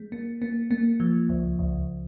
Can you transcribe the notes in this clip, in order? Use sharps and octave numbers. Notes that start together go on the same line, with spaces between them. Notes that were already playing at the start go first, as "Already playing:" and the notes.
Already playing: G#3
A#3
A#3
A#3
F3
C#2
C#2